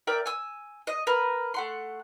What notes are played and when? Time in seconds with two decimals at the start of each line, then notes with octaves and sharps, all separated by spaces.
0.07 A#4 D5 E5 G5
0.26 G#5 E6
0.87 D#5
1.07 A#4 B4
1.54 A3 F#5 C6